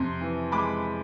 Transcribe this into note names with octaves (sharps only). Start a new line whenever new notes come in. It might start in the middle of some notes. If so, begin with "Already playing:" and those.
Already playing: F2 C3 C6
E3
G#3 B5 D6